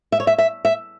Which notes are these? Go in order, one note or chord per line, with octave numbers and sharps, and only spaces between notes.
E5
C#5
E5
E5
E5